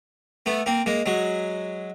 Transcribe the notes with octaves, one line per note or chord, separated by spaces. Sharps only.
A3 B3
A#3 C4
G#3 A#3
F#3 G#3